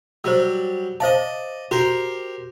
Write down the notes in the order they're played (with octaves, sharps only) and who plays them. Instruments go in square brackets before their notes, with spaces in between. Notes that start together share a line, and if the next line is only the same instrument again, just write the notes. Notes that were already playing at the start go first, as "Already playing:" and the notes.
[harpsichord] F#3 G3 [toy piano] C5 E6
[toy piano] C5 F5 A5 [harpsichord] D5 D#5
[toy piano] F#4 [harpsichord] G4 A#4 C5